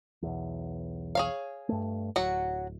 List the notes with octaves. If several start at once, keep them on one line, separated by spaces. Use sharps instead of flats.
B1 E2
G#4 C#5 F5
G2 A3
D1 F#3 F#4